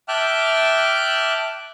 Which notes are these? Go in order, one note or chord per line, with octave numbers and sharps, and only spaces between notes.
E5 G5 A5 D6 F6 F#6